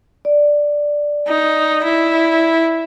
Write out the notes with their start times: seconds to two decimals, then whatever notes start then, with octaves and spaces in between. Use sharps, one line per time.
0.25 D5
1.27 D#4
1.85 E4